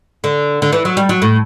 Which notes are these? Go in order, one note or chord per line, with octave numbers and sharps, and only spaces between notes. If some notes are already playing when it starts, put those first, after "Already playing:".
D3
D3
E3
F#3
G3
F#3
A2